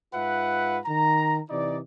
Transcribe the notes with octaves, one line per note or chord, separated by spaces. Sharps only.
G#2 F4 B4 E5 F#5
D#3 A#5
C3 E3 D#4 D5